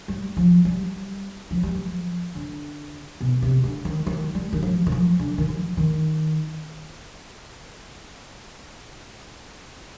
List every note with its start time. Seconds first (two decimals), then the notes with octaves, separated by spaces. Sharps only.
0.08 G3
0.37 F3
0.65 G3
1.51 F3
1.63 G3
1.75 F3
2.35 D3
3.21 B2
3.42 C3
3.64 D3
3.85 D#3
4.07 D#3
4.35 G3
4.53 D#3
4.63 F3
4.87 D#3
4.92 F3
5.19 D3
5.38 D#3
5.48 F3
5.77 D#3